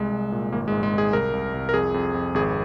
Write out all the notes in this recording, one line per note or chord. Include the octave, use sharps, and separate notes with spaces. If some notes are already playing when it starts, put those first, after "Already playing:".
Already playing: C2 G#3
C2
A#2
G#1 A#3
G#3
G#2
G#3
G#1
G#4
C2 A#4
C2
C2
A#4
F2 G#4
F2
F2
G#1 G#4